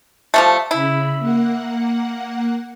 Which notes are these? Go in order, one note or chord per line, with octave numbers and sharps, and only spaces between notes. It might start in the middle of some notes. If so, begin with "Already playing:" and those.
F3 G3 A3
C#3 E4 B5
A#3 F#5